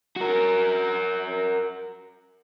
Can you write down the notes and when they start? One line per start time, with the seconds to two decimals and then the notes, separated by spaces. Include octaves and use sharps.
0.17 F#4 A#4